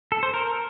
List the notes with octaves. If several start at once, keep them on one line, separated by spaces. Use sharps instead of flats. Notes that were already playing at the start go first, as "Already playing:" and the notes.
A4
C5
A#4